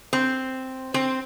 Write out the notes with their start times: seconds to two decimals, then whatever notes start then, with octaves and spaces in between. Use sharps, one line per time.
0.13 C4
0.94 C4